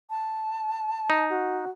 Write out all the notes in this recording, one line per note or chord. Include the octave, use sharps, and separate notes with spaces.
A5
D#4
F#4